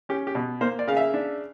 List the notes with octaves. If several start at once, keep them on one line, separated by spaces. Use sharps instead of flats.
C#4 G4
G4
B2
A#3 C5
D5
C#3 F5
E5
D4